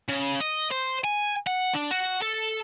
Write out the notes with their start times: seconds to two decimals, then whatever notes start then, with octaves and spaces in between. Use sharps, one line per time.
0.09 C#3
0.41 D#5
0.71 C5
1.04 G#5
1.47 F#5
1.74 D4
1.91 F#4
2.22 A4